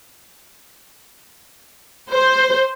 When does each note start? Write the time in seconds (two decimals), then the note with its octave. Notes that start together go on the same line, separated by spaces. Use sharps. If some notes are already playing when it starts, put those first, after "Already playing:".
2.12 C5